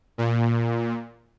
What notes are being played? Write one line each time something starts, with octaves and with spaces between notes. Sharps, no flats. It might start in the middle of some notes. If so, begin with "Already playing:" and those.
A#2